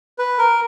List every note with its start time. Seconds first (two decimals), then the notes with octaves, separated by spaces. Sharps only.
0.19 B4
0.38 A#4